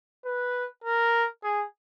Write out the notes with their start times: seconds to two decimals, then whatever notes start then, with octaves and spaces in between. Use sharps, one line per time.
0.25 B4
0.84 A#4
1.43 G#4